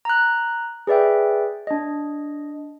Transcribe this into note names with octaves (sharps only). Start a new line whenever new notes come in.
A#5 F#6
G#4 B4 D5 E5 G5
D4 D#5